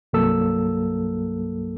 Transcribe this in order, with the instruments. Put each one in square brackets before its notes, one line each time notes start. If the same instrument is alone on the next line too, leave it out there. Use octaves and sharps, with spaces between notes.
[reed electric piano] C2 G2 F#3 A#3 A4 E6